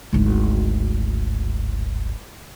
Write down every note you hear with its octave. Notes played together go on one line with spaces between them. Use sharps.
D1 G#1